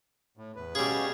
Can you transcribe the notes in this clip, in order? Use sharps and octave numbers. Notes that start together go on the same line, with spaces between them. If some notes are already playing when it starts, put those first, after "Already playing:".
A2
E2 B4
B2 G3 C#4 G#4 F5